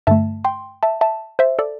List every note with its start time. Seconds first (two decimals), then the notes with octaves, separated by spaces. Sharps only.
0.07 G2 D3 A3 E5 A5
0.45 G5 C6
0.83 E5 A5
1.01 E5 A5
1.39 C5 E5
1.59 A4 D5